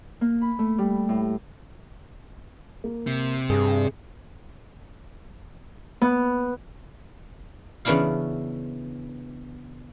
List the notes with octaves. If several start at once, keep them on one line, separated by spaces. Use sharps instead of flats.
A#3
B5
A3
G3
A2
A#3
C3
G2 G#4
B3
C#3 E3 B3 D4 E4 F5